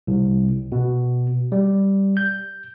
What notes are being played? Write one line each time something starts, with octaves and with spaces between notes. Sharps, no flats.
C2
B2
G3
G6